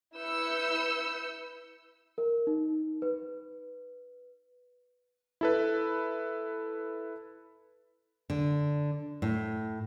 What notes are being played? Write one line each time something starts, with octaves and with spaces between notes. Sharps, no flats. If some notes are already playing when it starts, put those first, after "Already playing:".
E4 B4 E6 G6 C#7
A#4
D#4
B4
E4 A4 B4
D3
A2